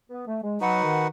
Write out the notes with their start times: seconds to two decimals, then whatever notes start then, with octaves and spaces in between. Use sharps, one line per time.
0.10 B3
0.27 A3
0.43 G#3
0.60 F#3 D#4 F#4 B4 F#5
0.83 D#3